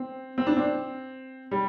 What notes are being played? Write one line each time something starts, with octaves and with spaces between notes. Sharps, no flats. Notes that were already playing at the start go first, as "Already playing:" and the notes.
Already playing: C4
C4
D4
C4
G3